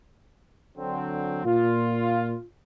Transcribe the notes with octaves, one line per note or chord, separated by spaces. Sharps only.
D3 F#3 C4
A#2 F4